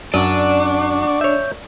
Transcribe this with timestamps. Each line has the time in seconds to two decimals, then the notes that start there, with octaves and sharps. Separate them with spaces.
0.14 F#2 D4 D5 F#5 C#6 D6
1.21 C#5 E5 G6